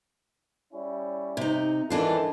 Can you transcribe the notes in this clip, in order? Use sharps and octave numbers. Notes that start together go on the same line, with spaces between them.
G3 C#4 E4
C3 D#4
D#3 E3 D4 E4 F4 A4